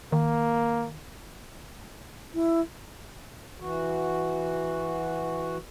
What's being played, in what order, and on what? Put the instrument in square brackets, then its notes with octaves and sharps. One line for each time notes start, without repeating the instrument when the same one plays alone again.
[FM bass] D#3 [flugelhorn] A#3
[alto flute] E4
[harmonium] E3 F#4